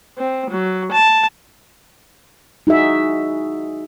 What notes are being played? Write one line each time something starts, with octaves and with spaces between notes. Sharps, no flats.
C4
F#3
A5
D#4 F#4 G#4 E5